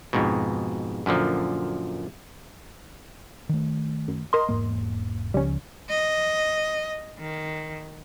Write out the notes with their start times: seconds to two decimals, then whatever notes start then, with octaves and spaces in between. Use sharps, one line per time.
0.13 F2 G#2 B2
1.06 F#2 A#2 D3 F3
3.49 D#3 A3
4.08 F#2
4.33 A#4 D#5 C6
4.49 E1 G#2 A#3
5.34 C#2 C#3 F3 G3 C#4
5.90 D#5
7.19 D#3